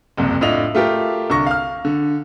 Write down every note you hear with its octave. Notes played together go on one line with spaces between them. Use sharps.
F#1 C2 F2
A2 D4 F4 D#5 F7
A3 F4 G4 A#4
C2 D3 C#6 A#6
F5 F6
D3